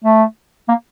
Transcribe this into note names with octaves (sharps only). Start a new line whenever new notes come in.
A3
A#3